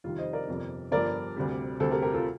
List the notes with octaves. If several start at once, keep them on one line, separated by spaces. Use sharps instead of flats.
F2 C3 D#3 G3 F4
C5 D#5
A#4 D5
G1 F2 C3
G1 G2 F3 A#4 D5
D2 C3 G3
D2 C3 G3 A4 C5
G4 A#4
G4 A#4
F4 A4